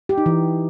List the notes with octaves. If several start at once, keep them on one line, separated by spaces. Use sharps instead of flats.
G4
D#4
E3